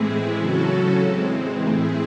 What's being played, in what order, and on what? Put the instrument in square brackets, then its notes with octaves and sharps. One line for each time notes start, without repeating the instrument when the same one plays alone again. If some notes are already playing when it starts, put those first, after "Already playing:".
Already playing: [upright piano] A2 [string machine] E3 G#3 C4 E4 G#4
[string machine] C#3 F#3 C#4 F#4 A4
E3 G#3 C4
[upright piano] A2 [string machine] C4 E4 G#4